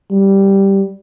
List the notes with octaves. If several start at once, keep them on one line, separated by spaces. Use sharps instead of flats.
G3